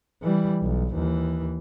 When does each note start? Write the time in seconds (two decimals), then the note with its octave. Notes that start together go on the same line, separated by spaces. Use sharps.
0.22 E3 G3
0.62 B1
0.93 D#2 E3